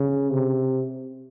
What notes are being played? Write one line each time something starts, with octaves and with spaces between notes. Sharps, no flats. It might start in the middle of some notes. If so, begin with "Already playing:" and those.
Already playing: C#3
C3